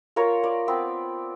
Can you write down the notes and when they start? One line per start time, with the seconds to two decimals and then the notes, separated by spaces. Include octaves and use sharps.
0.16 F4 A#4 C#5
0.43 D5
0.68 B3 C4